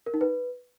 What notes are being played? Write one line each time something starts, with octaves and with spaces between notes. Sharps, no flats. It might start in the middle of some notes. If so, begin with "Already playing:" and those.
A#4
D#4
B4